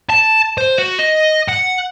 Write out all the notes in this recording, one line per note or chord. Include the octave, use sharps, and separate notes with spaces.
A5
C5
F#4
D#5
F#5